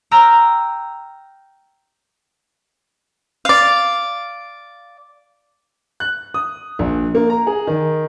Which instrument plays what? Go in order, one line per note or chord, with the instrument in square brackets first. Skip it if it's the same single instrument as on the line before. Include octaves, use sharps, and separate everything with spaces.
[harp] G5 A#5 E6 F6
[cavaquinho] D5 F5
[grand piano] F#6
D#6
A#1
A#3
A#5
G#4
D#3